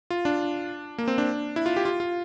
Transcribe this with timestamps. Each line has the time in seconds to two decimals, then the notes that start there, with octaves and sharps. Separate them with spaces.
0.10 F4
0.25 D4
0.98 A#3
1.08 C4
1.18 D4
1.56 E4
1.66 F4
1.77 G4
1.85 F4
2.00 F4